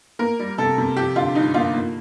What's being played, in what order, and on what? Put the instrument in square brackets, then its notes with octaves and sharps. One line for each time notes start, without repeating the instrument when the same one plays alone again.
[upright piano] A#3 A#4
G3
C3 A4
C3
F3 G4
D3 F4
G2 D#4
A#3 F4
A#3